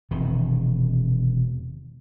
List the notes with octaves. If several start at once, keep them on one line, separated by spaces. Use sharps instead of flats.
E1 C3 D#3